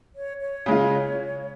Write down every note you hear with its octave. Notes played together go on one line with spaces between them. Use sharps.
C#5
C#5
C#3 G#3 F4